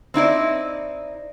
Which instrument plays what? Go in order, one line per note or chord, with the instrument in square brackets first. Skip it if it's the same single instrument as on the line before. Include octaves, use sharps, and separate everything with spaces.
[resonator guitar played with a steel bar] C4 D#4 E4 D5